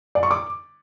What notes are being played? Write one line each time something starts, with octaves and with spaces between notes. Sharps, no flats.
D5
C#6
D6